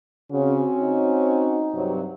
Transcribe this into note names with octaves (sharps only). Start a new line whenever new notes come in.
C#3 C4 C#4 F#4
D#4
G2 C3 F#3